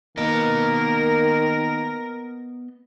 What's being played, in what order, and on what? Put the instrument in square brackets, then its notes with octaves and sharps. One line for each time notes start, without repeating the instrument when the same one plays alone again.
[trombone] D#3 [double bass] A#3 [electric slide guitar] B3 D#5 [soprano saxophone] A#4